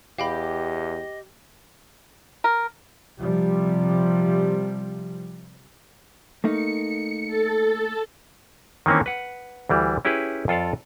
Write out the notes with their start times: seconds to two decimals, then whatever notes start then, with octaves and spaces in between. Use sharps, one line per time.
0.18 E2 G4 D#5 F5 G5 B5
2.44 A#4
3.20 C3 F3 G3
6.44 A3 A#3 D#4 C#7
7.27 A4 A6
8.86 D#3 E3 A#3 C4 C#4
9.06 B4 F#5
9.69 D2 E3 G3
10.05 C#4 E4 G4 G#4 B4
10.48 F2 F4 A4 D5 F5